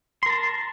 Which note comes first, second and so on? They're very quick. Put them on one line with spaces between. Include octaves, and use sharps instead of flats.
C6 A#4 A5